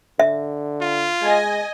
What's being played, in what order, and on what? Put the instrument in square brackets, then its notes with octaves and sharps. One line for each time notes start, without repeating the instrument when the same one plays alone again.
[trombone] D3 [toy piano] E5
[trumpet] F4
[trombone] G#3 [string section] D#5 G#5